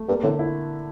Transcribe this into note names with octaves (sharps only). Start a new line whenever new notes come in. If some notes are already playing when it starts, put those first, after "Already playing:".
Already playing: A3
G2 A#3
A2 D3
E4